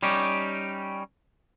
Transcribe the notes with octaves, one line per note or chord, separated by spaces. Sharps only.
G3 C#4 D#4 G4